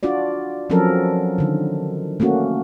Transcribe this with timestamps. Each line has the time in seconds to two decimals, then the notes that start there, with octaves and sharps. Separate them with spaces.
0.03 D4 F4 F#4 D5
0.70 F3 F#3 C4 C#4 A4 A#4
1.38 D3 D#3
2.20 A3 A#3 C#4 F#4